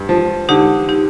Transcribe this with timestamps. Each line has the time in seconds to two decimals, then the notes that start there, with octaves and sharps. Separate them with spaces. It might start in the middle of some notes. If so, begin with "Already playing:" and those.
Already playing: G2
0.09 F3
0.49 D3 D#4 G4
0.89 D#4 G4